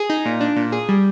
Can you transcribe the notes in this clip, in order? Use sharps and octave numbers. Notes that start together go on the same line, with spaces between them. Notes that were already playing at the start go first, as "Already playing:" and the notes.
Already playing: G#4
D#4
A#2
D4
A#2
G#4
G3